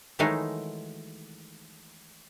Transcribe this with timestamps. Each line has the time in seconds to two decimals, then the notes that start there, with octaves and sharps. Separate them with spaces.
0.19 D#3 E3 F#3 G#3 A3 D#4